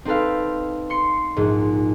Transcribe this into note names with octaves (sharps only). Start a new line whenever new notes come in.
C4 D#4 A4 B4 F5
C6 C#7
A#1 G#2